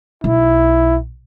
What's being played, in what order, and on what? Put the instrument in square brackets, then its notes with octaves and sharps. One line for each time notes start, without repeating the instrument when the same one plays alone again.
[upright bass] B1 [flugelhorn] E4